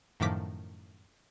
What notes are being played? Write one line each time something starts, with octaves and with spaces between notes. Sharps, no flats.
F#2 A2 D#3 F3 D6 B6